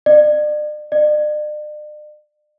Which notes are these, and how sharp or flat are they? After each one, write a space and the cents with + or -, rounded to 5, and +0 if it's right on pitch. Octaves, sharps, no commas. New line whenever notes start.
D5 +40
D5 +45